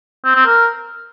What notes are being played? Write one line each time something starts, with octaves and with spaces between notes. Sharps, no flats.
C4
C4
A#4